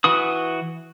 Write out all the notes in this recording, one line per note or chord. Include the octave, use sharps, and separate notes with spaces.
E3 F#4 B4 D#6